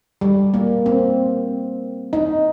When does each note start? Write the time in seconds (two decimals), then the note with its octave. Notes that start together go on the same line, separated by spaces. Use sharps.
0.21 G3
0.54 A#3
0.86 C4
2.13 D#4